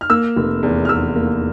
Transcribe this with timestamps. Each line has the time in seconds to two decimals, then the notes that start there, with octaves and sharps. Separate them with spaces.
0.01 F6
0.10 A#3 E6
0.36 F1
0.63 E2
0.85 F6
0.89 E2 E6
1.16 A#3